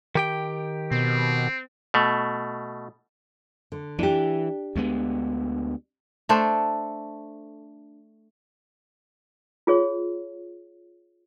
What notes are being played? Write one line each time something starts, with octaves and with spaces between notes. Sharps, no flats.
D#3 G4 G5
B2 C4
B2 A3
D3
E3 D4 G4
D2 G#3 B3
A3 D4 A4 C5
F4 G#4 C#5